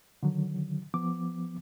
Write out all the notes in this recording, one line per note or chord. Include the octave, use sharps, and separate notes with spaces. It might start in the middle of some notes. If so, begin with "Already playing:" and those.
D3 D#3 F#3
F3 B3 D6